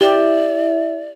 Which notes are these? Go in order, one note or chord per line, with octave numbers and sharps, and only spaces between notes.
E4 G4 D5 E5